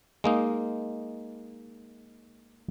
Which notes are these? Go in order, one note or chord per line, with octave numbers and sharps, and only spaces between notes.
G#3 A#3 D#4